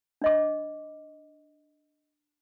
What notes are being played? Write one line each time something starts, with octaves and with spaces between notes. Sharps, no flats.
D4 D#5 D6